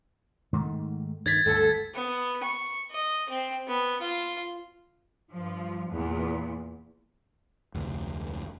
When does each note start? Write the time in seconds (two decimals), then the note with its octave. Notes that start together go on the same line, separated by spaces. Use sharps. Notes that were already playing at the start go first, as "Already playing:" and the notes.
0.53 G#2 D#3 A3
1.26 G2 D#3 G#6 A6 B6
1.46 G1 D2 A4
1.95 B3
2.43 C#6
2.91 D#5
3.29 C4
3.68 B3
4.01 F4
5.30 G2 F3
5.90 E2 A#2
7.74 F1 D2